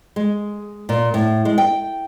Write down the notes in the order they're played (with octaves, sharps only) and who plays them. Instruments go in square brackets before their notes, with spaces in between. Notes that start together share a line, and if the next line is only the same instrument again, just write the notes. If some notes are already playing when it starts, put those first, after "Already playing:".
[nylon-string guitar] G#3
A#2
A2
G#3
G5